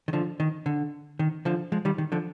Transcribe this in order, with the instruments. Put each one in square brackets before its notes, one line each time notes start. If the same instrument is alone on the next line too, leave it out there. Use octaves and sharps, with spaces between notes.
[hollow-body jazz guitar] D#3
D3 F3
D#3
D3
D#3
D3 F3
F3 G#3
D#3 G3
D#3
D3 F3